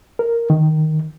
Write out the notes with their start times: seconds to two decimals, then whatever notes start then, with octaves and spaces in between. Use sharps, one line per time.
0.19 A#4
0.50 D#3